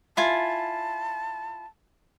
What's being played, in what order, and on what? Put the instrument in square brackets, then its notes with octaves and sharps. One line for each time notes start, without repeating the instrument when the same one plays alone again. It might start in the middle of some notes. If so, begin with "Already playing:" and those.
[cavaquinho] E4 F4 G#5 [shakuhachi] A5